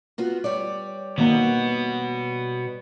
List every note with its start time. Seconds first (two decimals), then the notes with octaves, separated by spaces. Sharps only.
0.18 B3 F4 F#4
0.44 G3 C#5 D5
1.18 B2 D#3 A#3 B3